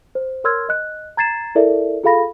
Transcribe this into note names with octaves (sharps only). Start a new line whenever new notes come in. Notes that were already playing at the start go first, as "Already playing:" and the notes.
C5
A#4 C#5 C6 E6 F6 G#6
D#5 F#6
A#5 G#6 A6 C7 E7
E4 A4 A#4 D5 E5
F4 G#4 A4 F5 B5 A#6